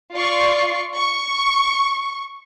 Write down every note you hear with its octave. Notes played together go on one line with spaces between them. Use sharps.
F4 D5 C#6 C7
C#6